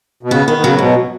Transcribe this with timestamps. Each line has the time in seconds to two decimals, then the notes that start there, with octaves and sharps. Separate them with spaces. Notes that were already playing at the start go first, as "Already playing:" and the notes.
0.23 B2
0.31 C#3 B3
0.47 D#3 B3
0.58 D#3
0.63 C#3 F#3
0.78 G#2 B2